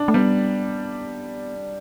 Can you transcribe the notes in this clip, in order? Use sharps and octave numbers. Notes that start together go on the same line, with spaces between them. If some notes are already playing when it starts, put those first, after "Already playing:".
Already playing: D4
A3
G3 B3